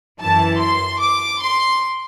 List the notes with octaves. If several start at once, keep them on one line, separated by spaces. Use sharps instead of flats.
F#2 E3 A5
C6
D6
C6